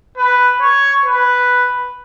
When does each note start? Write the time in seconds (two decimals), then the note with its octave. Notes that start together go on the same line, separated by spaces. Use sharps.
0.17 B4
0.61 C#5
1.05 B4